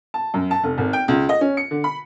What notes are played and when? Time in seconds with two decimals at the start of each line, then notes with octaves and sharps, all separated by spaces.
0.14 A5
0.34 F#2
0.51 A5
0.64 F1
0.78 G#1
0.93 G5
1.08 C#2
1.29 D#5
1.41 C#4
1.57 C#7
1.71 D3
1.84 B5